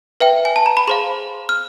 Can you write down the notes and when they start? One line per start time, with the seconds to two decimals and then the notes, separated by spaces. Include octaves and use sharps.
0.20 B4 E5 G5
0.45 G#5
0.56 A5
0.66 A#5
0.77 B5
0.87 G#4 C5 F5 C6
1.49 F6